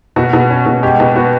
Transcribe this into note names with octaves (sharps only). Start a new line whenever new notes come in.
B2 F#4
B2
C#4
B2
G#3 G4
B2
B3 F#4